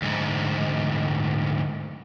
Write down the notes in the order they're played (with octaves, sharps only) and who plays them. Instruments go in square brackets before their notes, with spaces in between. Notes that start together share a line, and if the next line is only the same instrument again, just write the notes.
[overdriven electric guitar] D2 G#2